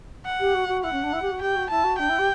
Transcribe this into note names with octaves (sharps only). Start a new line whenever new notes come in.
F#5
G4
F#4
F#4
E4 F#5
C#4
D4
E4
G4
F#4
G4 G5
F#4
E4 A5
F#4
D4 G5
E4
G4